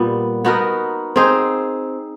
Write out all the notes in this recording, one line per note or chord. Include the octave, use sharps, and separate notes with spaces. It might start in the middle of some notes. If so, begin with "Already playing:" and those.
Already playing: A#2 G3 B3
B3 D#4 F#4 A#4
C4 D#4 G#4 C5